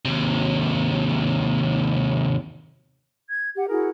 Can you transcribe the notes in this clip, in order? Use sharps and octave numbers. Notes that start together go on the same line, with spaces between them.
D#2 C3
G#6
G4 F#5
E4 F#4 G#4 A#4